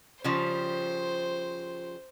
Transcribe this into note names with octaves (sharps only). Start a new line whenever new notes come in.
C#3 F3 G3 C5